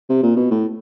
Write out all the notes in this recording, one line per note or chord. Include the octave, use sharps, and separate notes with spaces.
C3
A#2
B2
A2